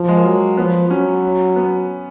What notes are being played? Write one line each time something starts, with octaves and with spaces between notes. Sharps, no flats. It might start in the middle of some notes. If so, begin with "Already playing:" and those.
Already playing: F3
G#3
A#3
F#3
F3 B3
F#3 C#4
B3